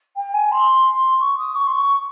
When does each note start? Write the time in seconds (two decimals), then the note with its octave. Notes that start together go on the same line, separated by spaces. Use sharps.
0.16 G5
0.33 G#5
0.51 C6
1.20 C#6
1.37 D#6
1.54 C#6
1.67 C6
1.71 C#6